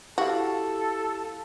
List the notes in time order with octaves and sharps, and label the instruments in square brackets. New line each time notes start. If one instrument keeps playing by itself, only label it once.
[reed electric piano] E4 G4 F5 [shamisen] F#4 [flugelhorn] A4